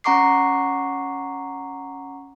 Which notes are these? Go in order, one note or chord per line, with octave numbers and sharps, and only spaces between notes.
C#4 F#5 A#5 C#6 D6 C7